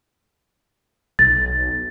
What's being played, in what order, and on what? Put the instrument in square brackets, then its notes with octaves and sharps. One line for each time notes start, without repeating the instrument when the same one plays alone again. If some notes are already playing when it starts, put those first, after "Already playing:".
[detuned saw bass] B1 [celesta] A6